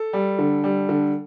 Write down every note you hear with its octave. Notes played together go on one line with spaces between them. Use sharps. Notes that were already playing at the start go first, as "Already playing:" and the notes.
Already playing: A4
G3
D3
G3
D3